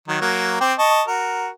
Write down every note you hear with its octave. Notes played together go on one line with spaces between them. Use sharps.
D#3 F#3
F#3 A#3
C4 G5 D6
D#5 A5 C#6
F#4 A#4